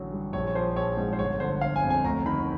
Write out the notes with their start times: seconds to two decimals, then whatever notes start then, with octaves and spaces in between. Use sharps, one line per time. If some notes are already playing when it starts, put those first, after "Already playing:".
Already playing: A1 D3 F#3
0.12 G2
0.33 A#1 C#5
0.48 C#5
0.55 F3 C5
0.76 A#1 C#5
0.97 G#2
1.13 C5
1.19 G1 C#5
1.40 D3 C5
1.61 G1 F5
1.76 G#5
1.83 F2
1.90 G#5
2.05 D2 A#5
2.26 D#3 B5